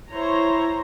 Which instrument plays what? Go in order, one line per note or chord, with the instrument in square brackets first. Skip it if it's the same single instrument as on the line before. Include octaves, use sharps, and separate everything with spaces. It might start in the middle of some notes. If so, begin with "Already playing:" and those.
[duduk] E4 [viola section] C5 C#5 A#5